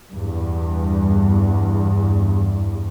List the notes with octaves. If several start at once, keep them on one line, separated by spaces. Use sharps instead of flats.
E2 G2